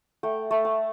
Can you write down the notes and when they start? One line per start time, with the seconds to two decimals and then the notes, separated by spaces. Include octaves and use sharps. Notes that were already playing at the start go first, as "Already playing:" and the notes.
0.23 A3 G5
0.51 A3
0.65 A5